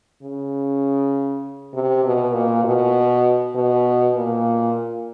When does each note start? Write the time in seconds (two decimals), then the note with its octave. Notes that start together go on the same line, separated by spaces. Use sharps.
0.22 C#3
1.74 C3
2.04 B2
2.34 A#2
2.64 B2
3.55 B2
4.16 A#2